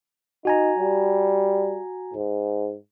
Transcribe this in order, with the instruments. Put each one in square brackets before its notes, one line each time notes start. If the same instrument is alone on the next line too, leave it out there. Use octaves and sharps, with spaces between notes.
[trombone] D#4 [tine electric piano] F#4 G#5 A#5
[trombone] G3
G#2